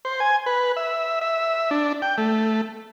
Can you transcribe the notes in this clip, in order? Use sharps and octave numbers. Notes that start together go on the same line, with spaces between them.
C5
G#5
B4
E5
E5
D4
G5
A3